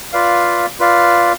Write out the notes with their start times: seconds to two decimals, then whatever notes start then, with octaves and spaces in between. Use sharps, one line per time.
0.13 F4 B4 D5 F5
0.79 F4 B4 D5 F5